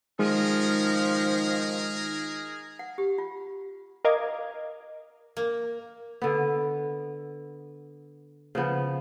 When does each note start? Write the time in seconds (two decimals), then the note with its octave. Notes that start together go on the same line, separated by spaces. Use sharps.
0.19 D#3 F3 G#3 G#4 A#4
2.79 F#5
2.98 G4
3.18 F4
4.04 A#4 D#5 F5 D6 G#6
5.37 A#3
6.22 D3 B3
8.55 C#3 F3 B3